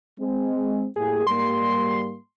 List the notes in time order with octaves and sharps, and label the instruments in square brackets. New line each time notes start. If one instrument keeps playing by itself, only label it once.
[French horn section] G#3 C4
[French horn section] A2 G3 A#3 [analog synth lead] G#4
[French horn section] G#2 G3 A#3 [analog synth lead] C6